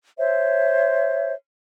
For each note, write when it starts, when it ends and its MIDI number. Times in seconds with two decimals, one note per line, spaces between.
0.19 1.33 72
0.19 1.33 73
0.19 1.33 76